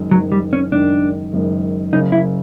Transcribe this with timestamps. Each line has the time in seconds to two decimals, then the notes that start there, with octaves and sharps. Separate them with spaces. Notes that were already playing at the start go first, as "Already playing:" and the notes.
Already playing: F#1 F#2 D#3 G#3
0.11 F#1 F#2 D#3 F#3 G#3
0.32 G3
0.53 C#4
0.72 F#1 F#2 D#3 G#3 D4
1.33 F#1 F#2 D#3 G#3
1.93 F#1 F#2 C#3 D#4
2.12 E4